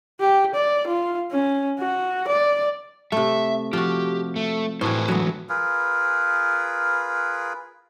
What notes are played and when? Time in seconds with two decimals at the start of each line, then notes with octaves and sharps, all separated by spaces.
0.20 G4
0.55 D5
0.87 F4
1.31 C#4
1.79 F#4
2.28 D5
3.12 C3 A3 E5
3.73 F3 F#4 G4
4.36 A3
4.81 A2 E3 F#4 B4 C5
5.08 D3 E3 F#3 G#3 B3
5.49 F4 G#4 A#4 B4